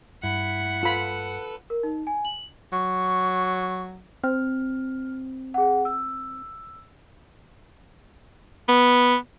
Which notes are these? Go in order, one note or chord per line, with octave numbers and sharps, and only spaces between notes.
G2 E4 F#5 B5
F4 A4 B4 B5
A#4
D#4
G#5
F#7
F#3 C#6
C4 F6
G#4 F#5
E6
B3